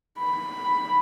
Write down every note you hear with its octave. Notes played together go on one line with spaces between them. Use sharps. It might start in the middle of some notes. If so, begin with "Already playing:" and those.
B5